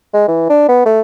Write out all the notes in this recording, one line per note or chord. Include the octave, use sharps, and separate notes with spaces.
G#3
E3
D4
B3
A3